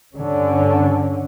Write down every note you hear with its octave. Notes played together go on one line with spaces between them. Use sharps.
G2 D3 C#4